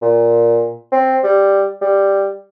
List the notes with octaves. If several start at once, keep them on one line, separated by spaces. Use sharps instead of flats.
A#2
C4
G3
G3